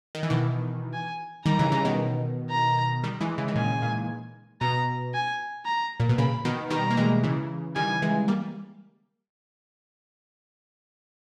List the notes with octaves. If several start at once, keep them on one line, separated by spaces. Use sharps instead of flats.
D#3
E3
B2 D#3
G#5
D#3 G3 A#5
C#3 E3
C#3 E3
B2 D#3
A#5
D#3 G3
E3 G#3
C#3 E3
D#3
A#2 C#3 G#5
A#2
B2 A#5
G#5
A#5
A#2
B2
A#2 C#3 B5
B2 D#3
D#3 G3 A#5
A#3
E3 G#3
C#3 E3
D#3 G3 G#5
E3 G#3
G3 A#3